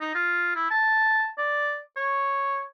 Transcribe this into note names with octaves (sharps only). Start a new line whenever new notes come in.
D#4
F4
E4
A5
D5
C#5